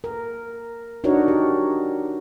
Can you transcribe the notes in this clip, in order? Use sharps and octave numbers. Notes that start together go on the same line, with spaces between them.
A#4
D4 D#4 F#4 A#4 C#5
G4